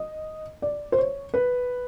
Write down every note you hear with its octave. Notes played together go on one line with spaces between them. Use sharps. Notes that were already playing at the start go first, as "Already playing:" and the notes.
Already playing: D#5
D5
C5
C#5
B4